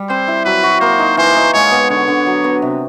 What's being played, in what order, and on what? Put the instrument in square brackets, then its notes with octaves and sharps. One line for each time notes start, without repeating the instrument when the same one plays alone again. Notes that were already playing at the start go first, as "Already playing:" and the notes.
Already playing: [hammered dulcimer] G3
[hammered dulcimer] C4 [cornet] C5
[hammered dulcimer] E4
[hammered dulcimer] F#3 [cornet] B4
[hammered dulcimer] F#4
[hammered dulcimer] A#3 [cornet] C5
[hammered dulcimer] D#4
[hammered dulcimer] E3 [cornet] C5
[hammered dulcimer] D#4
[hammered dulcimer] G#3 [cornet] C#5
[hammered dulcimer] B3
[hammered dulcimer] D3 [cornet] C#5
[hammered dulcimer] D3
F#3
B3
C3